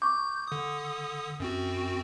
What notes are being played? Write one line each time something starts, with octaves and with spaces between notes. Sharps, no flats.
C#6 D6 G6
D3 D#6
F#2 C4 F#4